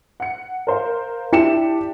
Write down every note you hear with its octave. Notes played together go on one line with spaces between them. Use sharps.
F#5 C#7
A#4 C5 F5
D4 E4 G4 C#7 E7